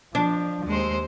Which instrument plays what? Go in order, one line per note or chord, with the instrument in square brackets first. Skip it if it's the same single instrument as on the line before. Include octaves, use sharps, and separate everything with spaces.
[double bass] F3 [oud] D4
[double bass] D#2 [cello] G#3 C5